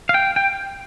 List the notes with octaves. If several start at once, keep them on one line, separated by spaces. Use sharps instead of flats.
F5
G5
G5